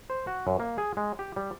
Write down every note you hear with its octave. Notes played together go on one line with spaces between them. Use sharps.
C5
F#4
F#2
A#3
G#4
G#3
G4
G3